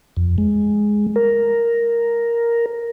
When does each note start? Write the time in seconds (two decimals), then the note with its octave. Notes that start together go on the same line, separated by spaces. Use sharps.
0.17 F2
0.38 G#3
1.16 A#4